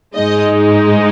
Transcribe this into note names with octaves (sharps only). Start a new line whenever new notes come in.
G#2 G#3 D#4 D#5